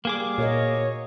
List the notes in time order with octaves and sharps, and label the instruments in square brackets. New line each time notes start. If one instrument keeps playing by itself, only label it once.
[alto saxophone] G3 [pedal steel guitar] A#3 G#4 D6
[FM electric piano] A#2 [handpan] F#4 A#4 D#5 [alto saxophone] C#5